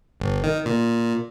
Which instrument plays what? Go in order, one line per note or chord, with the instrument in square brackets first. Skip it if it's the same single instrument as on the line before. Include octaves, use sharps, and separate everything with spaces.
[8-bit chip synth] G1
D#3
A#2